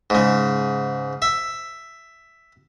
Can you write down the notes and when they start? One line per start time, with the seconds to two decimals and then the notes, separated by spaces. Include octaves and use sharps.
0.10 G#2 C#3
1.22 E5